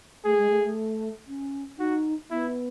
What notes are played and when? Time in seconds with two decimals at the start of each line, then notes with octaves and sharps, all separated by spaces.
0.25 A3 G#4
0.38 G#3
0.50 A3
0.64 A3
1.28 C#4
1.78 D#4 F#4
2.30 B3 E4